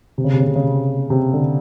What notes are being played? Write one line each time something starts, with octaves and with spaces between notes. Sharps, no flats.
C3
C#3
C3
C#3
C3
C#3
C3
C3
D3